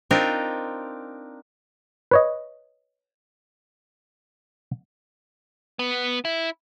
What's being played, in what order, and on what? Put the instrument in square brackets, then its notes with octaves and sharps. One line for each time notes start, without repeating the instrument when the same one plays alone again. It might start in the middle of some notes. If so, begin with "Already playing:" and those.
[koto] C4 D4 D#4 F4 A#4
[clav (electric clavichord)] B4 C#5 D#5
[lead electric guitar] B3
E4